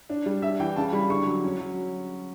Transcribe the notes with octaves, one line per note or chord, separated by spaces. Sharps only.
D4
G3
D4 E5
E3 G5
C#3 A5
G3 B5
D3 C#6
F#3
C#4
F#3